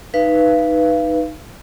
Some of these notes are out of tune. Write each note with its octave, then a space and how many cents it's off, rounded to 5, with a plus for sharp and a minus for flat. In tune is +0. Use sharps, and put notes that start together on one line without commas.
D#4 +0 B4 +0 F5 -35